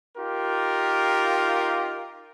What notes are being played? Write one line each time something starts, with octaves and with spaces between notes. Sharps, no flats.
D#4 F4 G4 A#4